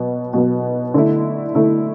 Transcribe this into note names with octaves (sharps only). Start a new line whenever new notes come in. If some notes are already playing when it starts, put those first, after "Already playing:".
Already playing: B2 F#3 B3
B2 F#3 B3
D3 A3 E4
D3 A3 E4